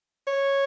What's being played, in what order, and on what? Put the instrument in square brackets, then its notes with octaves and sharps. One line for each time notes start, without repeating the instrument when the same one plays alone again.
[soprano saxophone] C#5